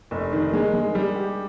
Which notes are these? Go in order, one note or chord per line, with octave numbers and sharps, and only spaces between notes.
F1
D#3
G#3
G#3
G3
G4